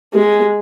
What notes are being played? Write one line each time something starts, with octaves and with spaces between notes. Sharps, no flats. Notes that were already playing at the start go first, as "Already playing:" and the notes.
G#3